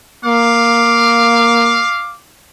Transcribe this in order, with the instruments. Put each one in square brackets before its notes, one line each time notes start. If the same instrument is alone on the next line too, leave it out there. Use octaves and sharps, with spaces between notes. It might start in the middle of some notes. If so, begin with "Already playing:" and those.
[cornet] A#3 [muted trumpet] F5 [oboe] D6